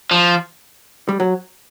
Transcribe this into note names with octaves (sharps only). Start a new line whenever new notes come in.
F3
G3
F#3